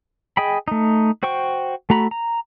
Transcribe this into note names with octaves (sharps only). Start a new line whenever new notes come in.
G#4 D#5 G5 B5
A3 D#4
F#4 C5 G5 C#6
A3 F#4 A#5 B5
A#5